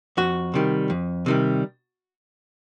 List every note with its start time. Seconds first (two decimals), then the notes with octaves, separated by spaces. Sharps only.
0.17 F2 F#4
0.54 C3 D#3 G3
0.90 F2
1.26 C3 D#3 G3